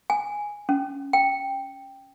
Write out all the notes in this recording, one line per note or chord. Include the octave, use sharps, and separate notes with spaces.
G#5
C#4
G5